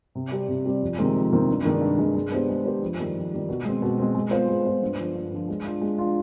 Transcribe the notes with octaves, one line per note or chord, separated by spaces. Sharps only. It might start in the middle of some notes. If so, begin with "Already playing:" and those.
C3
G3 C4 G4 D5
C3
G3 C4 G4 D5
F2
C3 D#3 G#3 C4
F2
C3 D#3 G#3 C4
G2
D#3 G#3 D4
G2
D#3 G#3 D4
G#3
B3 D4 G4 C5
G#3
B3 D4 G4 C5
F2
D#3 G3
F2
D#3 G3
B2
G#3 C4
B2
G#3 C4
G#3
B3 F4 C5
G#3
B3 F4 C5
G2
D3 F3
G2
D3 F3
G#3
D4 F4
G#3
D4 F4